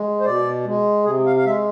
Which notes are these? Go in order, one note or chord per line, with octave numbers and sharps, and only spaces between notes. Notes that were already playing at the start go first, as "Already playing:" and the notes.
Already playing: G#3
C5
B2 D5
G#3
C3 G#4
F5
F5
G#3 E5